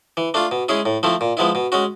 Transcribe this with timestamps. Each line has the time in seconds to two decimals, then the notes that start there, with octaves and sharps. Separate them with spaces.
0.17 E3
0.34 A3 D4 F4
0.51 B2
0.69 G#3 C#4 E4 G#4
0.86 A2
1.03 F3 A3 C4 E4
1.21 A#2
1.37 F3 G#3 B3 E4
1.55 B2
1.72 G#3 C#4 F#4